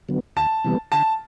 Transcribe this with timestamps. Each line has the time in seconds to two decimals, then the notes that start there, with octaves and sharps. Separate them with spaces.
0.09 D3 F#3 B3
0.36 D2 A5
0.64 C3 E3 G3 B3
0.92 D3 A5